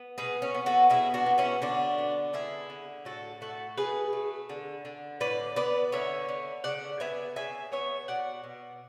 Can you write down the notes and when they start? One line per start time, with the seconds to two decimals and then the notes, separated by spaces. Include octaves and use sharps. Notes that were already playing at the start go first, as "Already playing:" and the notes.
Already playing: B3
0.18 B2 G#4 B4
0.42 C#4
0.55 B3
0.66 F#4 A4
0.90 B2 E4 G#4
1.14 D4 F#4
1.26 B3
1.38 C#4 E4
1.62 D3 D4 F#4
1.98 B3
2.33 D3 E4 G#4
2.70 D3
3.05 A2 F#4 A4
3.41 A3 F#4 A4
3.77 B2 G#4 B4
4.13 A3
4.49 D3
4.85 D3
5.20 A2 B4 D5
5.56 B3 B4 D5
5.92 D3 C#5 E5
6.29 D3
6.64 C#3 D5 F#5
7.00 B3 E5 G#5
7.36 C#3 E5 G#5
7.72 B3 C#5 E5
8.08 B2 D5 F#5
8.44 B2